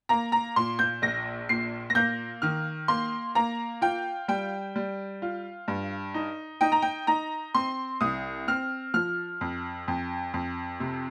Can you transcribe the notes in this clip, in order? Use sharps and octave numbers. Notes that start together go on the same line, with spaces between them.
A#3 A#5
A#5
A#2 C6
G6
A#1 A#6
A#2 C7
A#6
A#3 G6
D#3 F6
A#3 C6
A#3 A#5
F4 G5
G3 G5
G3
F4
G2
D#4
D#4 G5
A#5
G5
D#4 A#5
C4 C6
C2 D#6
C4 F6
F3 F6
F2
F2
F2
C3